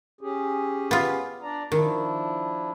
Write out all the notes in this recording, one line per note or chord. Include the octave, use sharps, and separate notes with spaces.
C#4 G4 G#4
B3 F4
D4 D5 A#5
D#3 F3 D4 E4